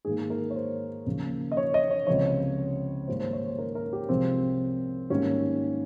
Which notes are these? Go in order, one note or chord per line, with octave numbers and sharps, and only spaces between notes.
G#2 D#3 A#3 G#4
A#4
C#5
C5
D#2 C#3 F3 A#3
D#5
C#5
D#5
C#5
C#2 C3 F3 C#5
G#2 D#3 G3 A#3 C5
C5
C#5
C5
A#4
A#4
G4
C2 C3 F3 G#3 C4
G#2 D#3 G3 A#3 C#4